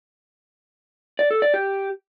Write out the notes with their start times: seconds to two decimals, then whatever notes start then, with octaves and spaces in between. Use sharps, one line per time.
1.19 D5
1.31 A4
1.42 D5
1.54 G4